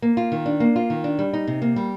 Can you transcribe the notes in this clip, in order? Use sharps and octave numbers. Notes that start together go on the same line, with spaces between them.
A#3
F4
D#3
D4
A#3
F4
D#3
D4
G3
D#4
C3
A#3
G3